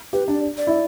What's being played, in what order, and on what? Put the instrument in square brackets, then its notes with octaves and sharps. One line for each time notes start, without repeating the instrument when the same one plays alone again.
[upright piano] G4 [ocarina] B4
[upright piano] D4 [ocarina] D5
[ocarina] D5
[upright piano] E4